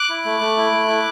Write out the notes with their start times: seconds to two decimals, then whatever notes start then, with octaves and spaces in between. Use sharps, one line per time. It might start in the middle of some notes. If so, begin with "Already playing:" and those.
Already playing: D6 F#6
0.09 E4
0.25 A3
0.40 A3
0.57 E4
0.72 A3
0.87 E4